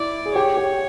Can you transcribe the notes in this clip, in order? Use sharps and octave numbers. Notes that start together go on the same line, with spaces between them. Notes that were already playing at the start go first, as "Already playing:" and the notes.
Already playing: E4 D5
G#4
G4 C#5
G4